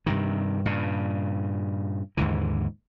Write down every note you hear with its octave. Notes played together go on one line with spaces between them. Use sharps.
G2 C3 D#3
G2 A#2 C#3
D#2 G#2 D3 E3